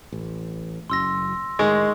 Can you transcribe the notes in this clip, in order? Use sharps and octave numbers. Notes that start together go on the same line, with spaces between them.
A1
F#1 F#2 C6 E6 A#6
A2 D#3 G#3 C#6 D#6